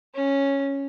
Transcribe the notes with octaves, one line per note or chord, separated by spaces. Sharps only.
C#4